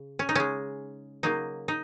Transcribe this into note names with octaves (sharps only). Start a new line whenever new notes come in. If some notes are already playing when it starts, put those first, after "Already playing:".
Already playing: C#3
C#4
D#4
C#3 G#3 C#4
C#3 F#3 A#3 D#4
D#4